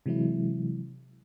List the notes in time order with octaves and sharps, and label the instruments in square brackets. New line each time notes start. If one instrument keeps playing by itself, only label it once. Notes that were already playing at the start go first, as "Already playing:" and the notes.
[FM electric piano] C3 E3 F#3 G#3 E4